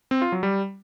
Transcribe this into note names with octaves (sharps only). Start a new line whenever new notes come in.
C4
F4
F#3
G3